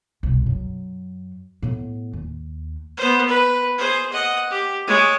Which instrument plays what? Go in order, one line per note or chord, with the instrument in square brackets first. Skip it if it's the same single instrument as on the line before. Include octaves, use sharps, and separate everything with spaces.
[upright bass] C2 B2
F#2
A2 B3
D#2
[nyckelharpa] B3 C5
B4
G#4 C5
D#5 F#5
G4
G#3 C#5